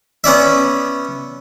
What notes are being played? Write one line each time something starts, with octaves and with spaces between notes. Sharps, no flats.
B3 C#4 D5 E5